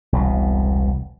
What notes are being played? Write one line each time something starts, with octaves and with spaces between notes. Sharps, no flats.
E1 C2 B2